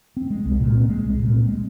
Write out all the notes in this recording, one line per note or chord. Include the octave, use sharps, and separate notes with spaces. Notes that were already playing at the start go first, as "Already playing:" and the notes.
C4
G#3
C2
A#2
C4
G#3
C2
A#2
C4
G#3